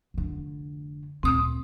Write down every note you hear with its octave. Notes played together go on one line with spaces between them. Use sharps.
F1 D3
D2 A#2 C4 D#6